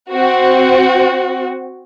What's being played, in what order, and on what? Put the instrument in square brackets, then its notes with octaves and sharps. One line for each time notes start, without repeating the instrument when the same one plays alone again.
[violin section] C4 F#4